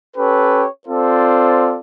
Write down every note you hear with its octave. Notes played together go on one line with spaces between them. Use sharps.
C#4 G4 A4 B4 C#5
C4 F4 A4 C5 D5